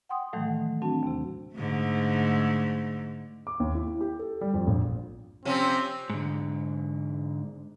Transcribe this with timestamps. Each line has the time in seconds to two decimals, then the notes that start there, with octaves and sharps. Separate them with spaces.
0.09 F#5 G5 C6 D#6
0.33 A2 D#3 E3 F#3 G#3 A3
0.82 F#3 C4 D4 F#4 A5
1.03 D#2 C3
1.55 G#2 D3 A3
3.47 D6
3.60 D#2
3.75 E4
3.87 E4
4.01 G4
4.19 A4
4.41 G3
4.54 F2
4.67 A#1
5.45 C3 F3 C4 C#4
6.10 G#2 D3